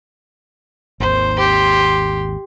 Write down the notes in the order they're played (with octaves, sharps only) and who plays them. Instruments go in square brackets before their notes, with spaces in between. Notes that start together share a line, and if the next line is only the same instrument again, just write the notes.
[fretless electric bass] G#1 D#2 [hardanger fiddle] C5
[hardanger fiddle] G4 C6